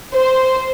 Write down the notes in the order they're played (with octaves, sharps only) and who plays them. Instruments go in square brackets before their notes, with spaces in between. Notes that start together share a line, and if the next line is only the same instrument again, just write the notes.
[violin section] C5